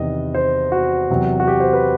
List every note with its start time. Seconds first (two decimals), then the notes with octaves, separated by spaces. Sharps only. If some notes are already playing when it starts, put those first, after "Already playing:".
Already playing: E2 C3 D#3 D#5
0.34 C5
0.72 F#4
1.10 E2 C3 F#3
1.40 F#4
1.48 G4
1.60 C5
1.73 B4